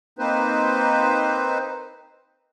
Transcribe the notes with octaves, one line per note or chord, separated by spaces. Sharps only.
A#3 C4 D#4 B4 C5